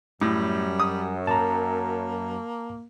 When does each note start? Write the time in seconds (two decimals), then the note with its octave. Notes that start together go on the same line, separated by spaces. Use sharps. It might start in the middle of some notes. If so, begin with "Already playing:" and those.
0.22 F#2 A2 G3
0.80 D#6
1.27 A#3 A5 A#5